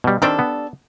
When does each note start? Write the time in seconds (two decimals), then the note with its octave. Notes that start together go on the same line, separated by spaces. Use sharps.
0.04 B2 G3
0.22 D#3 G3 C4 D4 A4
0.39 B3